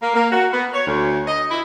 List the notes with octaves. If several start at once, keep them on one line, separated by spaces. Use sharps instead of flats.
A#3
A#3
F#4
B3
C#5
D2
D#5
E4